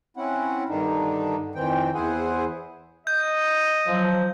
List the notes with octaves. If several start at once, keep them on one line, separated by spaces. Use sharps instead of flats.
C4 C#4 E4 F#5
G2 D3 D#3 D4 D#4
F2 D#3 E3 C4 G5
E2 E4 G#4 C5 F#5 G#5
D#5 G6
F3 F#3